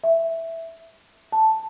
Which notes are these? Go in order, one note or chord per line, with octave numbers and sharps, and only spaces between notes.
E5
A5